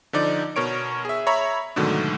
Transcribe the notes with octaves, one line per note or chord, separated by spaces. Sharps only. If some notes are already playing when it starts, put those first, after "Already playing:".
D3 F3 D#4 D5
B2 A#4 C#5 D7
G#4 E5
C#5 E5 A#5 B5
G#2 B2 D3 D#3 F#3 A3